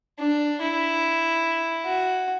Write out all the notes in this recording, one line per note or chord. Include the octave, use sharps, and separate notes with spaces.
D4
E4
F#4